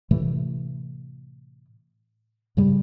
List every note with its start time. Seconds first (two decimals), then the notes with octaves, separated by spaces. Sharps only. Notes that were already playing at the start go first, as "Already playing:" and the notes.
0.11 A2 C3 E3 A3
2.57 G2 C#3 G3